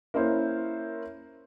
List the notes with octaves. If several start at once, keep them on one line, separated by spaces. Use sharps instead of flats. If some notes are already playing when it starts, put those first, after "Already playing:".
A#3 C#4 E4 C5 C#5